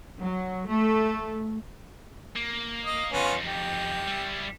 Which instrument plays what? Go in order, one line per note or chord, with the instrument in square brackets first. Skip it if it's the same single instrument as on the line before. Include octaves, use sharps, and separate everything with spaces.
[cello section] F#3
A3
[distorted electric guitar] A#3
[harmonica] D#5
[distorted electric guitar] F2 D#4 [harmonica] B3 C#4 F4
[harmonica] G4
[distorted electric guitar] G3 E4